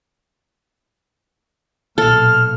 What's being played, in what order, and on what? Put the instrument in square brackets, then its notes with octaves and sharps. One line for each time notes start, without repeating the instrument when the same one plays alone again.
[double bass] B1 A#2 [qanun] A4 [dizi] F6